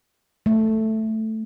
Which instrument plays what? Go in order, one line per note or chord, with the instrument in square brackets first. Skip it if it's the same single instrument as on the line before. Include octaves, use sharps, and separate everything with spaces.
[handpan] A3